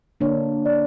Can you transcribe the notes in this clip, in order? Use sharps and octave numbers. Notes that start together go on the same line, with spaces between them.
D3 A#3 D4 C#5
D5